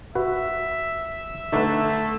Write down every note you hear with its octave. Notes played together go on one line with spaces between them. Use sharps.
F#4 B4 E5
D3 A3 D#4 B4